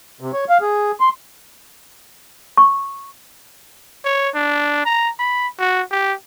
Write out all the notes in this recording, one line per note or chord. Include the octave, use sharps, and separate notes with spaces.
C3
C#5
F5
G#4
C6
C#6
C#5
D4
A#5
B5
F#4
G4